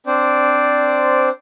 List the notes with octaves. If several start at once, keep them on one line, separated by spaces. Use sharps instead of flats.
C4 D4 C5 D5